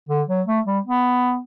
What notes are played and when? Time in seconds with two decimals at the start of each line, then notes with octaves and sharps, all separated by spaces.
0.09 D3
0.28 F#3
0.47 A3
0.66 G3
0.86 B3